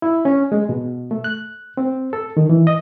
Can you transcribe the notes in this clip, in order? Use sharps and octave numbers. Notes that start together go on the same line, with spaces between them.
E4
C#4
G#3
B2
A3
F#6
C4
A4
D#3
E3
D#5